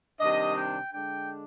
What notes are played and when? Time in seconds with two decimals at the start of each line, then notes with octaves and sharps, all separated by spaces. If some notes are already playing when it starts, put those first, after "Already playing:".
0.20 C3 D#3 G3 D4 D#5
0.56 G5
0.92 D3 G#3 D4 G5